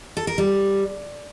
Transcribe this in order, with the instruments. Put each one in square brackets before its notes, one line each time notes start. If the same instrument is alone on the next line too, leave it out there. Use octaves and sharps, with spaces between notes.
[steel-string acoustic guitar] A4
A#4
G3